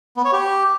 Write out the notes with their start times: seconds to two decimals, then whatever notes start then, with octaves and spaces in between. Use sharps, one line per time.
0.17 B3
0.25 C#5
0.33 G4